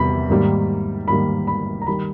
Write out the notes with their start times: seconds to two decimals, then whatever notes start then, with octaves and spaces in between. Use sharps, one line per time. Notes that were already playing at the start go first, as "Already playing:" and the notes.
Already playing: E2 C3 G3 B5
0.29 G#2 D#3 G3 A#3
1.08 G#2 D#3 G3 A#3 B5
1.47 B5
1.82 A#5
1.87 D#3 G3 B5